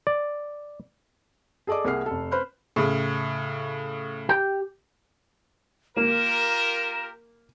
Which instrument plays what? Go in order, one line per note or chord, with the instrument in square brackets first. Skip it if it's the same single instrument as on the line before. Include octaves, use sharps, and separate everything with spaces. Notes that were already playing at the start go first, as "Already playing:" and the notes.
[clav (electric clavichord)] D5
[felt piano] G#4 A4 D5 D#5 D6
C2 A#3 G#4 F#5 F6 C7
F1 A4
B4 C5 B5 F6 F#6
[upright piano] A2 C#3
[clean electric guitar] G4 G5
[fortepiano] A#3 [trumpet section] F4 G4 A#4 [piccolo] E7